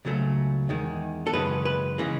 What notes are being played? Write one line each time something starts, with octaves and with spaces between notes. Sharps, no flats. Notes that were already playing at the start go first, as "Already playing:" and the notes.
C#2 C#3 F#3 A3
E2 D#3 G#3
A4
F#2 C#3 E3 G#3 B4
B4
C#3 E3 G#3